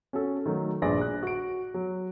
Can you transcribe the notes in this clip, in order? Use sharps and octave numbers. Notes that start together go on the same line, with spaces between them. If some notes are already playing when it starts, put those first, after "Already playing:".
C#4 F#4 A4
D#3 F#3 A3
A#1 G2 G#4 B4 D5 A#6
F#6
F#4 D7
F#3